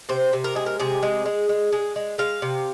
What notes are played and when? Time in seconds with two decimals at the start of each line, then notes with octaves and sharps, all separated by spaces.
0.09 C3 C5
0.33 C3
0.44 A#4
0.55 G#3 G#4
0.66 A#4
0.80 C3 G#4
1.03 G#3
1.26 G#3
1.49 G#3
1.73 G#3
1.96 G#3
2.18 G#3 F5
2.42 C3